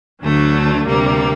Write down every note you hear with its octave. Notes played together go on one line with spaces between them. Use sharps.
D2 D3 F#3 A3
D2 C3 G3 A#3